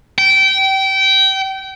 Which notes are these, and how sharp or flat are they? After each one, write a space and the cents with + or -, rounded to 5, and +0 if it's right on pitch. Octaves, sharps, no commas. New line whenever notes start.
G5 -25